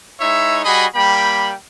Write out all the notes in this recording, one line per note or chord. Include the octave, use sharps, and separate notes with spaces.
G#3 D#4 E4 C#5 E5
G3 F#4 G#4 D#5 B5
G3 A#3 G5 B5